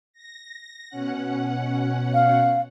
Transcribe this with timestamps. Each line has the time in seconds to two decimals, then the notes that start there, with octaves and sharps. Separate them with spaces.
0.13 A#6
0.90 B2 C#4 F#5
2.14 F5